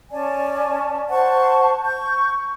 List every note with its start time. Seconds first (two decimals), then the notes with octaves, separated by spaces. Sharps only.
0.10 C#4 D5 G#5 A5
1.09 C5 F#5 A5 C#6
1.83 C#6 G6